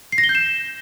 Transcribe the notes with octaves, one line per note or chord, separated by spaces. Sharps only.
C7
A#6
G7
G6
E7